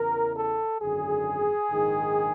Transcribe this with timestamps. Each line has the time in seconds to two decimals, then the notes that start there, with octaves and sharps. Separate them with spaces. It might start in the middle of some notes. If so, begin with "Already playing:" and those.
Already playing: E2 C#3 E3 A#4
0.35 A4
0.80 G#1 F#2 D3 G#4
1.70 A#1 G#2 D#3